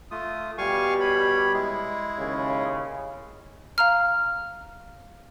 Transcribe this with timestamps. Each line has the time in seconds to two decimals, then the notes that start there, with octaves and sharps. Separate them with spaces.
0.11 A3 F4 D#6
0.58 B2 G3 F5 G#5 C#6
1.00 C#5 B5
1.54 G#3 E4 G#4
2.19 D#2 C#3
3.78 F5 A#5 F6